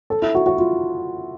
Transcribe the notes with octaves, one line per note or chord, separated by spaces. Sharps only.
A4
E4
F#4
F#4
F4